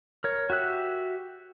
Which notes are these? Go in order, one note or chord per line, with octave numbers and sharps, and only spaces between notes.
A#4 C#5
F#4 G4 E5 F#6